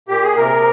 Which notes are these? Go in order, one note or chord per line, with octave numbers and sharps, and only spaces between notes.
A#2 G4
G#4
C3 A#4